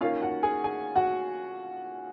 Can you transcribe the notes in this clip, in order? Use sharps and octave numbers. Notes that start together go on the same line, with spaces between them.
D#3 A#3 C#4 F4 F5
F#4 F#5
G#4 G#5
G#4 G#5
F#4 F#5